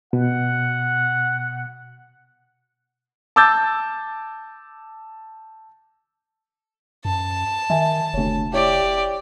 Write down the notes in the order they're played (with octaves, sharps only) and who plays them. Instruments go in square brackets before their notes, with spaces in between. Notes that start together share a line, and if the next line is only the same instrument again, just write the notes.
[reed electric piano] B2 [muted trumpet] F#5
[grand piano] A5 D6 E6 G6 A6
[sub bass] F#2 [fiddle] A5
[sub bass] D#3 [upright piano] E5 G#5
[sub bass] F1 [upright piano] D2 C#5
[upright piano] E4 C#5 [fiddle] G4 D5